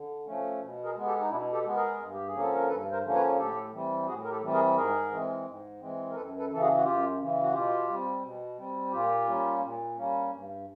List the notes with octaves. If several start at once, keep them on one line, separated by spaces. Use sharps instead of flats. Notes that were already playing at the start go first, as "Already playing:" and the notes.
Already playing: D3
F3 A3 C#4
B2
G#4 A#4
G#3 B3
G4 A4
D#4
B2 D4 E4
G4 A4
G#3 B3
G#4 A#4
G2
G4
G#4
D3 F3 A#3 C#4
A4
A#4
G2 A4 B4
A#4 C5
D3 F3 A#3 C#4
B4 C#5
A2 G4 A4
E3 G3 C4
A2 F#4 G#4
A#4
G4 A4
E3 G3 C4
G#4 A#4
G#2 G#4 A#4
E3 G#3 C4
G#2
E3 G#3 C4
A#4
F#2 A4 B4
A4 B4
C#3 E3 A4
F#4 G#4
F#4
F#2 F4 G4
C#3 E3
F#4
B2 F4 G4
G3 C4
B2
G3 C4
A#2 F4 G4
G3 A#3 C#4
A#2
G3 A#3 C#4
G2